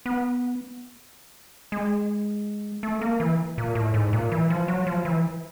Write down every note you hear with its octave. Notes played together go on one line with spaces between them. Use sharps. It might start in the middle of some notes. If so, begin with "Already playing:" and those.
B3
G#3
A3
A#3
E3
A#2
A2
G#2
A#2
E3
F3
F#3
F3
E3